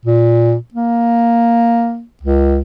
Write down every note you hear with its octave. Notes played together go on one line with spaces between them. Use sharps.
A#2
A#3
C#2